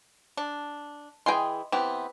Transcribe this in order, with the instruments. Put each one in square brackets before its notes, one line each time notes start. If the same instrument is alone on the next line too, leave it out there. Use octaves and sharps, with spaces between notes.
[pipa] D4
[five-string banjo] E3 G#4 G5 [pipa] D#5 C6
[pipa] E3 [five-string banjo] B3 C4 G4